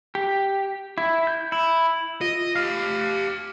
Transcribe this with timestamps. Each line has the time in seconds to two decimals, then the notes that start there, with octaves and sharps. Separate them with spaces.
0.15 G4
0.98 E4
1.27 G6
1.52 E4
2.21 F4 D#5
2.56 G4 F5 F6